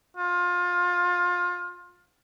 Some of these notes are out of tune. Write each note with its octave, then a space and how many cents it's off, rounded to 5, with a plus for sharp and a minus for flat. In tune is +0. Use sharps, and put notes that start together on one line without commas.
F4 +25